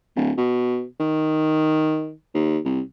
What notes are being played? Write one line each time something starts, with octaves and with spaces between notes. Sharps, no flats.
D1
B2
D#3
D#2
C2